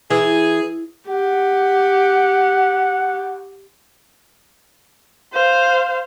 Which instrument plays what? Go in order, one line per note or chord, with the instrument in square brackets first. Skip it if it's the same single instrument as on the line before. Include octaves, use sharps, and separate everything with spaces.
[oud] E3 [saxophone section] G#4
[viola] G4 [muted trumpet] F#5
[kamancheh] C5 F5